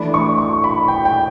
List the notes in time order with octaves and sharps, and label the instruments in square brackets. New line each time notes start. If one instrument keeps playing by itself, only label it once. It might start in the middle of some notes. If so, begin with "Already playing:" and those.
Already playing: [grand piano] E3 A3 D4 B5
C#6
C#6
B5
G5
G5